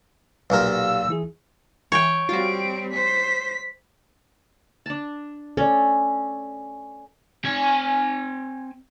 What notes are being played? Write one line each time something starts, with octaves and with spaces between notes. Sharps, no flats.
B1 A#2 G4 A#4 F5 E6
E3 E4 G#4
E3 C#5 G5
G3 C4 F4 F#4 D7
C5 B6
D4 A5
C#4 A4 D5
C4 G#5